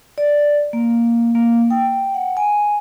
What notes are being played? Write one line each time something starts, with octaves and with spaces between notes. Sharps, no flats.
D5
A#3
A#3
G5
F#5
G#5